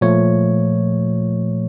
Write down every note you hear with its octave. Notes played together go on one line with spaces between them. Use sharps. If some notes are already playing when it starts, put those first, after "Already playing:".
A#2 F3 A3 C#5